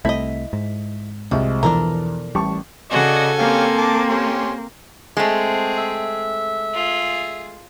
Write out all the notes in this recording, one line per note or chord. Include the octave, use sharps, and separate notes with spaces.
C2 A3 C4 E4 D#5 B6
G#2
C2 F3 G#3
E2 B2 E3 F3 D4 A4 A#4 A#5
A1 G3 A5 C#6
C#3 F#4 A4 D5 D#5 G#5
A#3 C4 C#4 G4 F5
A5 D6
C#4 G4 C6
G#3 A3 C4 G#4
E5
F4 G#4